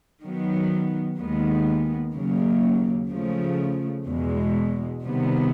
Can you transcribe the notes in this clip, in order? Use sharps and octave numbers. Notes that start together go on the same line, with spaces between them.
D#3 F#3 B3
D#2 D#3 G#3 B3
D#2 C#3 F#3 A#3
C#3 F3 A3
E2 B2 G#3
C3 D#3 G3 B3